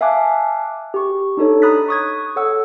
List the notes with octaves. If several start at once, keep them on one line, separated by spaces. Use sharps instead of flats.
E5 F5 G#5 A5 D6 F#6
G4 C#6
D4 D#4 A4 C#5
A#5 B5 D#6 F#6 A6 B6
C#6 D#6 G#6
A4 C#5 F#5 E6